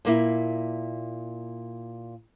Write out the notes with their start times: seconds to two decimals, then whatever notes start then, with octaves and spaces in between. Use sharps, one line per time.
0.05 A#2 A#3 E4